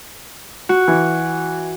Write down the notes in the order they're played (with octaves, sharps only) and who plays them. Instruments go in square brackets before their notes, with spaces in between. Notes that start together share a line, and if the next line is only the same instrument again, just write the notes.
[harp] F#4
[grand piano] E3